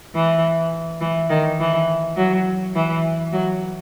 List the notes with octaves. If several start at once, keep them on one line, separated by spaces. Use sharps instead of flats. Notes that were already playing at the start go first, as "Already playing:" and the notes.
E3
E3
D#3
E3
F#3
E3
F#3